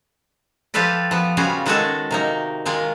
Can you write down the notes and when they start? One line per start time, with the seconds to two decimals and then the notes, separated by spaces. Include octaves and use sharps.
0.74 F3 F4 G4 A4 B4 D5
1.11 F3 B3
1.37 C#3 G3 C#4 F4 F#4 G#4
1.66 D#3 G#3 C#4 F#4 G#4 A4
2.11 C3 A#3 D#4
2.65 D#3 G#3 A#3 F4